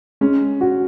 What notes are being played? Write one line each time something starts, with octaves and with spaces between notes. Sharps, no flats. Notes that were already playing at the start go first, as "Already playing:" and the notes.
G#3 C#4
F#4